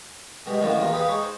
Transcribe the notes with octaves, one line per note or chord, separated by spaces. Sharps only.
B2 G3 G#3
F#2 A2 D3 D#3 F3 F#3
A#1 E2 F4 A#4
G4 G#4 B4 F5
G#3 D#4 C#5
C5